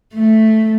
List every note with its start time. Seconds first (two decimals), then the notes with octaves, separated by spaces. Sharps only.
0.14 A3